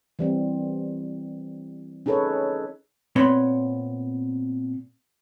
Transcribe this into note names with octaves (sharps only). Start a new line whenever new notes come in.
E3 G3 C4
C#4 D#4 G#4 A4 B4 C#5
A#2 B3 C4 C#5 B5 C6